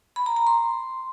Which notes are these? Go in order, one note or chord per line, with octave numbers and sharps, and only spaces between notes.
B5
A#5
A#5
C6